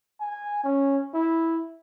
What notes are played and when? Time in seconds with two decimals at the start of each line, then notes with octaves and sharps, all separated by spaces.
0.20 G#5
0.64 C#4
1.14 E4